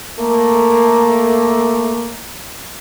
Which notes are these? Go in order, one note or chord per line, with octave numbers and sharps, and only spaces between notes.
A3 A#3